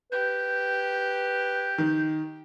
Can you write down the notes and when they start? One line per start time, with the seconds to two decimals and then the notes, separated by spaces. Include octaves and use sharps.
0.12 G4 B4 G6
1.78 D#3